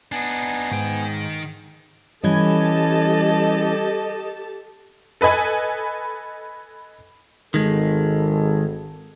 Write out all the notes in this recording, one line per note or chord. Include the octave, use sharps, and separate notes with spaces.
B3 D4 D#4 G#5
G#2 D#3 G5
E3 G3 C#4 G4 A4 D#5 A5 G#6
A4 B4 D#5 G#5 B5
G#1 D#3 G#3 A4